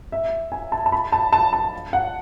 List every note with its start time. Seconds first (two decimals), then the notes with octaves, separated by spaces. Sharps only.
0.12 E5
0.52 G#5
0.72 A5
0.86 A5
0.92 B5
1.12 A5
1.33 A5
1.53 A5
1.93 F#5